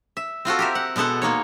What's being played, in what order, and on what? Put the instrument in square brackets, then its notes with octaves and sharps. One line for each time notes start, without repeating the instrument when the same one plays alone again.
[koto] E5
C4 F4 F#4 A4
G4 A#4 E5
F#5
B2 G#3 B3 A4 F#5
G#3 A#3 D#4 C#5